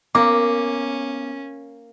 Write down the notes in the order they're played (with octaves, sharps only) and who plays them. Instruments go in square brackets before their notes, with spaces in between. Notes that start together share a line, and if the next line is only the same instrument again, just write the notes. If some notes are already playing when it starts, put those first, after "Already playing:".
[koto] A#3 [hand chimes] B3 F5 [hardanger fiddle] C#4 [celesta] D6